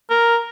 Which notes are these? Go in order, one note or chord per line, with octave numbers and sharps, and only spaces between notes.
A#4